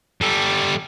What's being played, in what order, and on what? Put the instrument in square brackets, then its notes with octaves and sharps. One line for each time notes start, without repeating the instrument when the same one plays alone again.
[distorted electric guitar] G3 A4